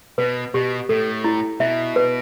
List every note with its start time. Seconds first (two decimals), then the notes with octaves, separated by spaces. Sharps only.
0.18 B2 B4
0.54 B2 G4
0.89 A2 A4
1.24 E4
1.60 B2 E5
1.96 B4